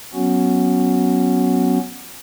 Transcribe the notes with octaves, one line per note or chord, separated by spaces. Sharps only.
F#3 B3 C#4 F#4